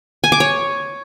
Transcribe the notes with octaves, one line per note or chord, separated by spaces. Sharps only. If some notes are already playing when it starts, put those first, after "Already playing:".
G#5
D6
C#5